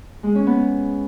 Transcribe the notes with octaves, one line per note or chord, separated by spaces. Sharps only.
G#3
C#4
B3